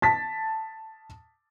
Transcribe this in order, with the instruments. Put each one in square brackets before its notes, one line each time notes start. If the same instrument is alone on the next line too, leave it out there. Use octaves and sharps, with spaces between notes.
[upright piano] A5 A6 B6